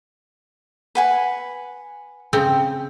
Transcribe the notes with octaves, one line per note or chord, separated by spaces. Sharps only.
B4 F#5 G#5
C#3 C4 G5